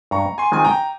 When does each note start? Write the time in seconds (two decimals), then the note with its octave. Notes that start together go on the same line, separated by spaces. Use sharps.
0.11 G2 A#5 C#6
0.38 G#5 C6
0.52 D#3 G#3 C4 F4 G#5
0.64 G5 A#5